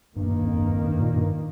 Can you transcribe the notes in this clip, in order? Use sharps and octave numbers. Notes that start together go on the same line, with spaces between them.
G2 D#3 A#3
G2
F2
G2
F2
G2
A#2
G2